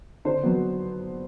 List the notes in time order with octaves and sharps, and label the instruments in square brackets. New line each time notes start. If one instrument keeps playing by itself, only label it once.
[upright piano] D3 C5
F#3 B3